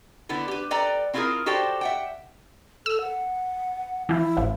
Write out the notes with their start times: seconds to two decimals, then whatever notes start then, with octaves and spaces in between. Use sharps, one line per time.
0.29 D3 B3 E4 A4
0.48 G4 B4
0.71 A4 B4 D5 G5 A#5
1.14 C4 E4 F4 G4 G#4 A#4
1.46 F#4 G4 A4 C5 D5 G5
1.81 E5 F#5 G5
2.86 A4 E6
3.01 F#5
4.09 E3 F3 E4
4.37 A1 F3